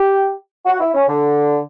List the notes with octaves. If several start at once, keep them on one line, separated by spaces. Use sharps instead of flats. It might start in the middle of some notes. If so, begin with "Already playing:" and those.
Already playing: G4
F#4
E4
C#4
D3